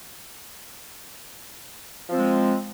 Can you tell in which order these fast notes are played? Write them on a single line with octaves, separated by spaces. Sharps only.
F3 C4 G#3